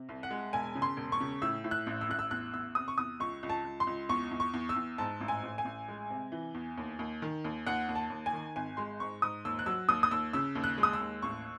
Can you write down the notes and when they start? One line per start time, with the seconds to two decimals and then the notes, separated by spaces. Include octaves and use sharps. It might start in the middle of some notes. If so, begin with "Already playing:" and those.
Already playing: C3
0.09 C2
0.23 F#5
0.31 G#3
0.53 E1 G#5
0.75 C#3
0.82 C6
0.97 E1
1.12 C#6
1.20 C#3
1.42 A2 E6
1.64 A2
1.71 F#6
1.87 A1
2.01 E6
2.09 A1 F#6
2.19 E6
2.31 E2 F#6
2.54 E2 E6
2.75 C3 D#6
2.88 C#6
2.98 E2 D#6
3.20 C#2 C#6
3.43 C#2
3.49 A5
3.65 C#2
3.80 C6
3.87 C#2
4.09 E2 C#6
4.31 E2
4.40 C#6
4.53 E2
4.69 E6
4.76 E2
4.98 G#2 A5
5.21 A1
5.28 G#5
5.43 A1
5.58 G#5
5.65 A1
5.88 G#3
6.10 C3
6.32 E3
6.54 E2
6.77 D#2
6.99 D#2
7.22 D#3
7.44 D#2
7.66 D#2 F#5
7.89 D#2
7.95 A5
8.10 D#2
8.26 G#5
8.33 D#3
8.56 G#1 G#5
8.77 G#3 C6
9.00 G#2 C#6
9.22 G#2 D#6
9.45 D#2 E6
9.59 F#6
9.66 F#3 E6
9.88 D#2 D#6
10.03 D#6
10.11 D#2 E6
10.33 C#3 E6
10.55 D#2
10.64 F#6
10.78 G#3
10.83 D#6
10.93 E6
11.01 D#2
11.22 A1 C#6